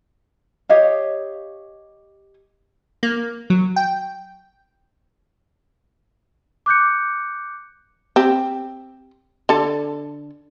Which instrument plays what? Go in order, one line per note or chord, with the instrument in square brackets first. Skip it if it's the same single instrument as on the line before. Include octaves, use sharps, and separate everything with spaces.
[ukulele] G4 C#5 D#5 F5
[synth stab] A#3
F#3
G5
[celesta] D6 F#6 G6 C#7
[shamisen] C4 G4
D3 A4